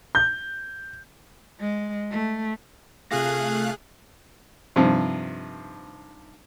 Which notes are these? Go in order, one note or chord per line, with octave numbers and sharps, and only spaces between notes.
G6
G#3
A3
C3 A3 F4 G#4 F5 F#6 A#6
G2 C3 D#3 F3